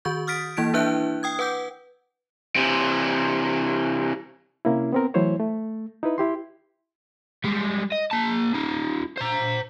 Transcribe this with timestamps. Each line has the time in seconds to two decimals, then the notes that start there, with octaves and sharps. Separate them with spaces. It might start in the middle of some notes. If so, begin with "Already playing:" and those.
0.05 D#3 F#4 C#6 G6
0.27 D#6 F6 A6 B6 D7
0.57 E3 A#3 E4 G#6 D7
0.74 D4 E4 B4 E5 F#6 G6
1.23 G5 D#6 G#6
1.39 B4 F#5 D6 G6
2.56 C3 E3
4.65 C3 A#3 C#4 E4
4.92 B3 C4 A#4
5.14 E3 F#3 A3 E4 C5 C#5
5.39 A3
6.03 D#4 E4 B4
6.18 E4 G4 C6
7.44 G3 G#3
7.92 D#5
8.11 A#3 A5
8.55 D#4 F4
9.18 C5 A#5